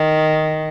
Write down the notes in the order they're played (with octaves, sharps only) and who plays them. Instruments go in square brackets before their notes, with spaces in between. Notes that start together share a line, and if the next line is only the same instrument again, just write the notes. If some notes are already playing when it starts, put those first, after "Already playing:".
Already playing: [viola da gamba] D#3